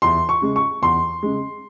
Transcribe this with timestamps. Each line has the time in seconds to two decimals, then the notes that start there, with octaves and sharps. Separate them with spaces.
0.02 E2 C6
0.29 C#6
0.42 C#3 G#3
0.56 C#6
0.82 E2 C6
1.23 C#3 G#3